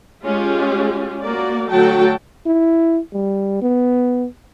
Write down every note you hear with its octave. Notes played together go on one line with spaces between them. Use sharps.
G#3 C#4 F4 G4
A#3 F#4 D5
D3 F#3 A3 F#4 G5 A5
E4
G3
B3